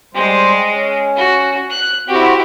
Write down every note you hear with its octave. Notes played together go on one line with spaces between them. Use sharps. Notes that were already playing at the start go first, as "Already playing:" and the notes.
G3 G#3 C5
C#4
F#4
F#6
C4 E4 F#4 G4